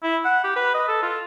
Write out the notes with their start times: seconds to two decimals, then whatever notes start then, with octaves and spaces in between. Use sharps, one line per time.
0.03 E4
0.25 F#5
0.44 G4
0.56 B4
0.74 D#5
0.88 A4
1.03 F4